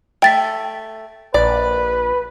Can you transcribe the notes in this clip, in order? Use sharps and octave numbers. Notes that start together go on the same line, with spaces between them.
A3 G5 A6 B6
A#1 B4 D5